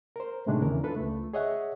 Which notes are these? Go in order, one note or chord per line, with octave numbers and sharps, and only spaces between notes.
A#4 C5
A2 C3 D#3 G#3 A3 D4
E2 C#3 E3 A#4
D4 F4 A4 B4
C#2 A3
G#4 C#5 D#5 E5 F#5